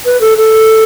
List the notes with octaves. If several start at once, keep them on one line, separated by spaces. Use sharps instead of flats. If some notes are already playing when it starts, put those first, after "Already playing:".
B4
A4
A4